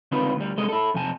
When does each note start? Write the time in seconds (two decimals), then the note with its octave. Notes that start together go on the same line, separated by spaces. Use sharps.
0.12 C#2 D3 C4 D#4 F4 B4
0.36 D2 G3
0.57 C2 C3 G#3 A4 D#5
0.69 E4 A4
0.94 F2 C3 G#5 A5